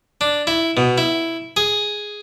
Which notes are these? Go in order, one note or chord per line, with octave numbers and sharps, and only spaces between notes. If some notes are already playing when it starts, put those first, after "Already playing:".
D4
E4
B2
E4
G#4